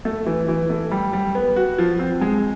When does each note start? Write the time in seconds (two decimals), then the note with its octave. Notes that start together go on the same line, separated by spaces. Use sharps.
0.05 A3
0.27 E3
0.48 E3
0.70 A3
0.91 G3
1.13 G3
1.35 B3
1.56 F#4
1.78 F3
1.99 C4
2.21 G#3